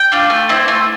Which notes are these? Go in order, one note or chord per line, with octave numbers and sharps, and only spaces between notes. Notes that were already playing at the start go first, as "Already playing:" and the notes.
Already playing: G5
D4 F4
A3
C4 E4
A3